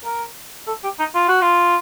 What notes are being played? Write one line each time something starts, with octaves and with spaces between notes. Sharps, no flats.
A#4
A4
G4
D#4
F4
F#4
F4